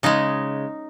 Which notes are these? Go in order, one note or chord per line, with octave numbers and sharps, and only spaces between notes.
C#3 G#3 D#4